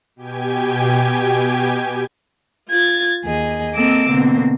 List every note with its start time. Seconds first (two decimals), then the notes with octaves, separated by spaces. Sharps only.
0.16 B2 G4 G5 G#5 G#6
2.69 F4 G#6 A6
3.24 D#2 G#4 D#5
3.76 A#3 C4 A4 D#5 D6 E6
4.08 B2 D3 A#3 C4